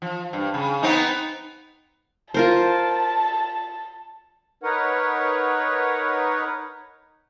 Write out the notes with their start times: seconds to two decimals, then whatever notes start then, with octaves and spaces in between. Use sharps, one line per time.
0.02 F3
0.33 G2
0.54 C#3
0.83 B3 C4 D#4
2.34 F4 A#4 C5 A5
4.63 D#4 A#4 B4 C#5 F#5